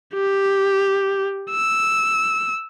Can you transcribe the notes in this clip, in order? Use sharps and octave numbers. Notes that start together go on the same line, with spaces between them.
G4
E6